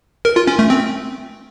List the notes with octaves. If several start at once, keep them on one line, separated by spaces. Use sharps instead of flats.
A#4
F4
C#4
A3
C4